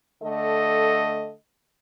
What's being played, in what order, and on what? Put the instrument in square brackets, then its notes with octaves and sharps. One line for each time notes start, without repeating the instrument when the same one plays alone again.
[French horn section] D3 A3 A4 D#5